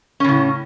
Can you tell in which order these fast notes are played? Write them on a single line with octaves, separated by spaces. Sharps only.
C#4 C#3 A2